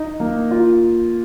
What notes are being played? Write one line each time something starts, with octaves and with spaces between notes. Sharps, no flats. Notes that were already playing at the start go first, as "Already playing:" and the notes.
Already playing: D#4
A#3
F4